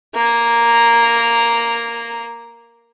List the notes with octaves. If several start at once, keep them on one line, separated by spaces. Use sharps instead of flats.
A#3 A#5